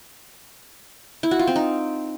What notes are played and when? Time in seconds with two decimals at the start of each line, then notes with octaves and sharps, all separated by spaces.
1.23 E4
1.31 F#4
1.39 F4
1.47 C4
1.56 D#4